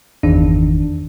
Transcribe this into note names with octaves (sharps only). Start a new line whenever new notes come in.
G1 E2 D#3 D4